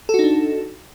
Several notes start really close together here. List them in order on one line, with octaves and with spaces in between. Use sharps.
A4 F#4 D#4 D4